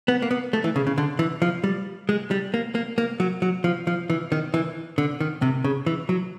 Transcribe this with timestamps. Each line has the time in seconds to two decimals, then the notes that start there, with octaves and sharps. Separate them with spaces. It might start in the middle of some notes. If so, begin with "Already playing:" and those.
0.08 B3
0.22 A#3
0.31 B3
0.53 A3
0.64 E3
0.76 C#3
0.87 C#3
0.98 D3
1.19 E3
1.42 F3
1.64 G3
2.09 G#3
2.31 G3
2.54 A#3
2.75 A#3
2.98 A#3
3.20 F#3
3.42 F#3
3.64 F3
3.87 F3
4.10 E3
4.32 D#3
4.54 E3
4.98 D3
5.20 D#3
5.42 C3
5.64 C#3
5.86 E3
6.09 F#3